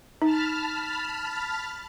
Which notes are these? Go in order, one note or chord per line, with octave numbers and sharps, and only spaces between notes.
D#4 A5 B5 F6